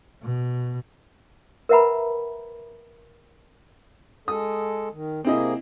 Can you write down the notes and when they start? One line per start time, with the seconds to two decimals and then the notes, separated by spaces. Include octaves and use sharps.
0.23 B2
1.69 A#4 B4 E5 F#5 A#5 B5
4.28 G#3 A4 D#6
4.93 D#3
5.25 C3 A#3 C4 E4 G#4 D#5